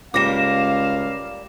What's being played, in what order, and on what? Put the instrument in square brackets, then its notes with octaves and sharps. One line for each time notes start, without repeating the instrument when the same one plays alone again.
[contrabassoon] C#2 [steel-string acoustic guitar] G3 A#3 [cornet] F5 [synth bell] D6 A#6 E7